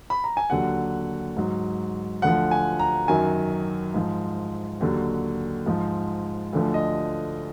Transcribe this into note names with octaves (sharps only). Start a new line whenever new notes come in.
B5
A#5
G#5
D#2 D3 F#3 F#5
G#2 F#3
D2 D3 F3 F#5
G#5
A#5
F#2 D#3 F#3 G#5
G#2 F3
D#2 D3 F#3
G#2 F3
D2 D3 F3
D#5